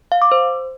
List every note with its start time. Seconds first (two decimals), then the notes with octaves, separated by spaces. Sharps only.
0.12 F5
0.22 D6
0.32 C5